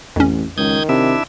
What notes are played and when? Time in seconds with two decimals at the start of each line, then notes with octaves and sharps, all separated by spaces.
0.16 A1 F2 C#4
0.58 C#2 D#3 D#6 G6 G#6
0.89 C3 D4 E4 E5